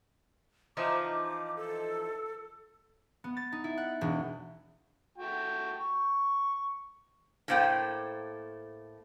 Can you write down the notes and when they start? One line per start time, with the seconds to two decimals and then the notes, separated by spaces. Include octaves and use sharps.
0.77 E3 F3 D#4 D6
1.56 A4
3.24 B3
3.37 A6
3.52 D#4
3.64 E4
3.77 F#5
4.01 E1
5.18 A3 F#4 G5
5.79 C#6
7.48 A2 A3 A#3 C5 G5